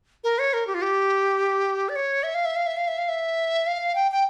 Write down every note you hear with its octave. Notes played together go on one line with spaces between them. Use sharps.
A#4
C#5
A#4
G4
F4
G4
D5
C#5
E5
F5
E5
F5
E5
F5
E5
F5
E5
F5
G5
G5